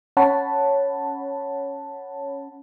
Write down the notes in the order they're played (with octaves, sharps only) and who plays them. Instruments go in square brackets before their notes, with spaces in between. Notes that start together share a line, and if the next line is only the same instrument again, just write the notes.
[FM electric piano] C#4 C#5 F#5 A5 B5